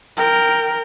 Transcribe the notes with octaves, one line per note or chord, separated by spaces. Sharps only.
A#4 G5